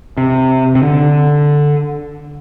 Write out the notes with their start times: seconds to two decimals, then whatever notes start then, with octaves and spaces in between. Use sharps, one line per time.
0.18 C3
0.75 C3
0.83 D3